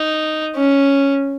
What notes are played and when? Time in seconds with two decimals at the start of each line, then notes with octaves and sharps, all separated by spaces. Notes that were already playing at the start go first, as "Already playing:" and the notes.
Already playing: D#4
0.55 C#4